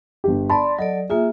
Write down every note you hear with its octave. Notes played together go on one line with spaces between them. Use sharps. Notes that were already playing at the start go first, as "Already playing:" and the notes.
G1 G4
D5 A5 B5 C6
F#3 A4 D5 D#5
A#3 F4 G#4 E5